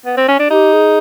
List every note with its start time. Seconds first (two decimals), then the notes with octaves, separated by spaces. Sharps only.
0.05 B3
0.17 C4
0.28 C#4
0.39 D4
0.50 D#4 G4
0.73 G#4